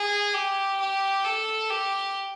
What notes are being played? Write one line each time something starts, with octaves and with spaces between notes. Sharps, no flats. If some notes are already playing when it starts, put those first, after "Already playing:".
Already playing: G#4
G4
G4
A4
G4